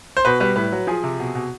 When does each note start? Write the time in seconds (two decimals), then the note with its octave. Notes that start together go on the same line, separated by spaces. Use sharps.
0.17 C5
0.25 B2 B4
0.40 G3 B4
0.56 A2 B4
0.72 F#3
0.87 F3 G#4
1.03 C3
1.20 B2
1.35 B2